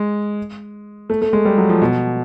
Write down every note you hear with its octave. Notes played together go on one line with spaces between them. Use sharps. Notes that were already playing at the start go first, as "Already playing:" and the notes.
Already playing: G#3
A3
A3
G#3
G3
F#3
F3
B2